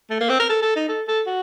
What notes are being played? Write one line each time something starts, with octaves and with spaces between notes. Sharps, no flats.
A3
A#3
C4
A#4
A4
A4
D#4
A4
A4
F#4